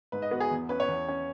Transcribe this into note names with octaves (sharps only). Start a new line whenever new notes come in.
G#2 B4
D#5
B3 F#4
G#4
E2
C#4 B4
C#5
E2
C#4